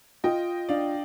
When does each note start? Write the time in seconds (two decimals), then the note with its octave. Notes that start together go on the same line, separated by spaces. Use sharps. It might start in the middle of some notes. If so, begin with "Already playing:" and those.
0.24 F4 D#5 G5
0.69 D4 D5 F5